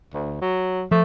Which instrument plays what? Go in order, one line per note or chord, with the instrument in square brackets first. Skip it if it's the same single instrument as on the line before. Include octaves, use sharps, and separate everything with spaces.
[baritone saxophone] D2
F#3
[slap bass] F3 [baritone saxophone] A3